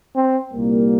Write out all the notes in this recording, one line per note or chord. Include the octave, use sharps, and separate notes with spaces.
C4
C2 A#2 G3 A#3